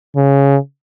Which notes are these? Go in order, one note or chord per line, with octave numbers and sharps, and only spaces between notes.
C#3